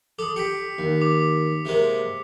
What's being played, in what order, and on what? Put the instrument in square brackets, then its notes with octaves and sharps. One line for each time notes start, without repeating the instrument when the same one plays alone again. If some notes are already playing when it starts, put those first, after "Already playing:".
[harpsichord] A4 [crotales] D6 D#6
[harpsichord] G4 [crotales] B6 C#7
[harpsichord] D#2
[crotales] D6
[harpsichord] C3 G#3 A#3